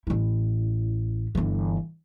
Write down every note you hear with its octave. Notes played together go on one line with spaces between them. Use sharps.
A1 E4
G1 E3